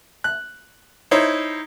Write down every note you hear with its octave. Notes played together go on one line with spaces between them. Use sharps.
F#6
D#4 E4 C5 C#5